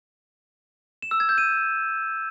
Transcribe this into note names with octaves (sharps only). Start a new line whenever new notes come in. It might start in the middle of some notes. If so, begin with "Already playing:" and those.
E7
E6
G#6
G6
D#7